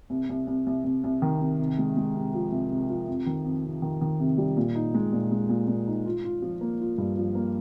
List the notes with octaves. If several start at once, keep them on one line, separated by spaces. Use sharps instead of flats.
C2
C2
C2
C2
C2
C2
D#3
C2
C3
G#3
G#3
C3
F3
C2
C3
F3
F2
D#3
F2
C3
D#3
D#3
C3
G3
A#2
D#4
G#3
A#2
G#3
A#2
A#2
D#4
F4
F4
F3
A#3
F4
G2
F3
A#3